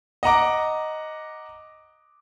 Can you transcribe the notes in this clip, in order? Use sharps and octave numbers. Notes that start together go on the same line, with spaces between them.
D#5 F#5 A#5 D6